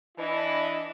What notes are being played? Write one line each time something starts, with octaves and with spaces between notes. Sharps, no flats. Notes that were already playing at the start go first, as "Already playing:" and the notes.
E3 D4 E4 D#5